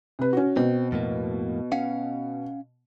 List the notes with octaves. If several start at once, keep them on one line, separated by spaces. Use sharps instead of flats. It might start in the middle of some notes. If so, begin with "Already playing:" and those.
C3 B4
C#4 F#4
B2 C4
F2 A2 A#3
C#4 F5 F#5